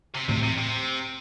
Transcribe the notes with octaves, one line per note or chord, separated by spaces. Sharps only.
C3
A2 C3 E3 A3 C4
C3
C3